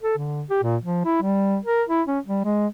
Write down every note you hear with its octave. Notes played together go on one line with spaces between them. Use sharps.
A4
D3
G4
A#2
F3
E4
G3
A#4
E4
C#4
G3
G#3